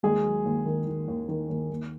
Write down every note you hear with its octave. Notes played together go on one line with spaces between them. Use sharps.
D#2 G#3 G#4
F#3
D#2
D#3
D#3
D#2
D#3
D#2
D#2